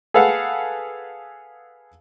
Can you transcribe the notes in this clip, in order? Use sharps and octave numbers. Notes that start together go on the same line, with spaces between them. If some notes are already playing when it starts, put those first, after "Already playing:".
G#4 A4 B4 F5 F#5